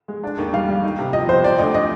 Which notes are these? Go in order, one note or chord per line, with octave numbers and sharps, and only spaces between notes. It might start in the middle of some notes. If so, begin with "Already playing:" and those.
G#3
D4
D#2
G3 F5
G3
D#4
C3
F3 D#5
C3 C5
C3 D5
D2 D#5
D#5